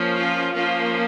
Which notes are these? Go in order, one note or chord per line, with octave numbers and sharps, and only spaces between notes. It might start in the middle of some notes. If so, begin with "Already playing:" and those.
Already playing: F3 A#3 C#4
F4
F3 A#3 C#4 F4